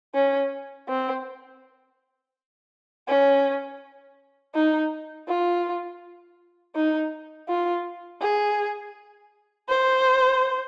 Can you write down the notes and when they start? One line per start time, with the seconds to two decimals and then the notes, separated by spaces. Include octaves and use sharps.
0.15 C#4
0.88 C4
3.08 C#4
4.55 D#4
5.28 F4
6.75 D#4
7.48 F4
8.21 G#4
9.69 C5